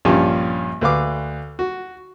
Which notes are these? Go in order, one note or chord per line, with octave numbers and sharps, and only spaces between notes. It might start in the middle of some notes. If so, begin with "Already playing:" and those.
A#1 G2 G3 C#4 F4 A5
D2 B4 F5 D6
F#4